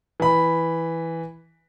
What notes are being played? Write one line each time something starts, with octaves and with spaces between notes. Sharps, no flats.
E3 B5